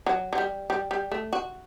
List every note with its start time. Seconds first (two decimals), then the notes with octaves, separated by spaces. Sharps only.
0.06 F#3
0.33 F#3
0.38 G3
0.70 G3
0.91 G3
1.12 A3
1.33 F#4